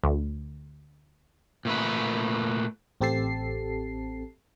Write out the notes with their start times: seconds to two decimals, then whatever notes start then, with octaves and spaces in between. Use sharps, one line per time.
0.03 D2
1.65 A#2 A3 B4
3.01 A1 C4 G4 A4 A5 C7